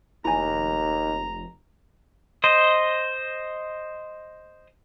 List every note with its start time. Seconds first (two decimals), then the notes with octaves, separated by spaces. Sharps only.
0.25 F1 D#2 E4 G#5 A#5
2.44 C5 D#5